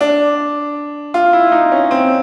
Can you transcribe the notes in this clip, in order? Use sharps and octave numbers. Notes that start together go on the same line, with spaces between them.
D4
F4
E4
D#4
C#4
C4